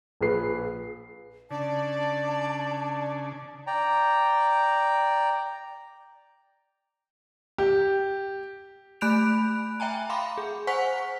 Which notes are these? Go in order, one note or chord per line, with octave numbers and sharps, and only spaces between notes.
A#1 G#4 B4 C7
C#3 D4 D5 A5
D5 G5 A#5
G4
A3 B5 F#6 G6 D7 F7
E5 G5 G#5 A#5
F5 B5 C6 D6
G#4
C5 F#5 G#5 C#6 B6